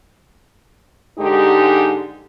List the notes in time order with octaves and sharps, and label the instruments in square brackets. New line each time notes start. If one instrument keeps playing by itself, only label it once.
[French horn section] G#2 D3 G#3 D#4 G4